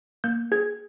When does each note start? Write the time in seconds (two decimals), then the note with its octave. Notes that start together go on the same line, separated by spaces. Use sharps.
0.24 A#3 G6
0.52 G#4 G#6